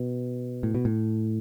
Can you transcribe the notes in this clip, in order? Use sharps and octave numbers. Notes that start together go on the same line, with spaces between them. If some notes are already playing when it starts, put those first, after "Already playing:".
Already playing: B2
A2
B2
A2